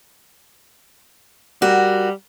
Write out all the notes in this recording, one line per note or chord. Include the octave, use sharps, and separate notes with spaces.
G3 F#4 A#4